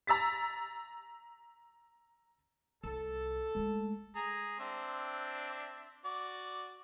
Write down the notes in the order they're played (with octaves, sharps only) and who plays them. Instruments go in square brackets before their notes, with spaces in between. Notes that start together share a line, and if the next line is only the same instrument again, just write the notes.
[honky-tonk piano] A#5 E6 A6 B6
[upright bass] C2 [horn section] A4
[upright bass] G#3 A3
[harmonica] G#4 A#5
C4 D4 E5
F#4 D5